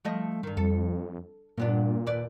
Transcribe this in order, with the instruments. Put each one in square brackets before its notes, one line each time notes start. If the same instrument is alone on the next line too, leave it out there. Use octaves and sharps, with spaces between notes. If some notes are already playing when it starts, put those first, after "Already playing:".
[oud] F3 A3 D#5
G2 D#3
[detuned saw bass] F2 [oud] A4
[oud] G2 B3 D4 [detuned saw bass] A#2
[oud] D#2 B4 D5